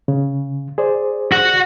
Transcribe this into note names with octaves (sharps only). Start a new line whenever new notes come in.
C#3
G#4 C5 D5
F#4 F#5